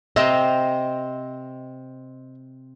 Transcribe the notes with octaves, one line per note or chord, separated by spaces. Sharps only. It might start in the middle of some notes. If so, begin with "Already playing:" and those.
C3 C4 D#5 E5 A#5